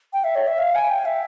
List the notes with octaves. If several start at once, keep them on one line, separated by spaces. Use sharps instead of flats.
G5
E5
C#5
E5
F5
G#5
G5
E5